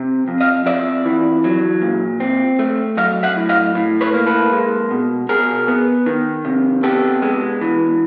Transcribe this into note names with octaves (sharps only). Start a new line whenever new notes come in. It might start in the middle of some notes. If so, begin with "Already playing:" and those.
Already playing: C3
F2
D#5 F5
F2 D5 E5
E3
F#3
A#2
C4
A3
F#3 D#5 F5
E5 F#5
A2
D#5 F5
A2
B4 C#5
A#3
A4 B4
G#3
B2
B2 G#4 A#4
B3
D#3
C3
B3 G4 A4
G#3
E3